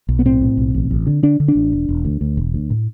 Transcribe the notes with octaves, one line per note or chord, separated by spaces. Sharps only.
B1
B3
A2 C4
A2
B1
A1
A1
D3
D3 D4
D3
D4
A1
E1
E1
D2
D2
E1
D2
A2